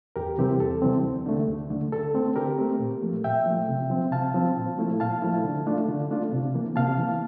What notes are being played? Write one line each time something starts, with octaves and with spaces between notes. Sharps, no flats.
E2 G4 A#4
C3 E3 G3 C4 G4
E2 A4
C3 E3 G3 C4
D2
D3 A3
D2
D3 A3
D3 A4
A3 C4
D3 G4 A#4
A3 C4
A#2
F3 A3
A#2 E5 G5
F3 A3
C3
F3 C4
C3 F5 A5
F3 C4
A#2
F3 A3 E4
A#2 F5 A5
F3 A3 E4
D3
A3 D4 F4
D3
A3 D4 F4
C3
E3 A#3
C3 F5 A5
E3 A#3